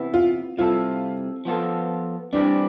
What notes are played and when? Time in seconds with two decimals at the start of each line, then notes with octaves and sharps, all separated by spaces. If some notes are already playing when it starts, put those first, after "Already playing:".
Already playing: C3 E3 B3 E4
0.14 F4
0.57 C3 G3 C4 E4 F4 A4
1.45 F3 B3 F4 A4
2.33 E3 G3 C4 D4 G4